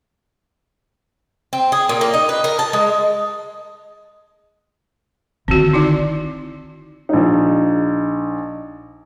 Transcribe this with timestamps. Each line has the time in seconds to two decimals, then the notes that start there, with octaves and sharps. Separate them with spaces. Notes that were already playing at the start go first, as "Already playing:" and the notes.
1.53 C4
1.72 G#4
1.89 A#2
2.01 A#3
2.14 D#4
2.29 B4
2.44 A#4
2.59 A5
2.73 G#3
5.48 D3 D#3 C4 F#4
5.73 D#4 E4 D5
7.09 A#1 D#4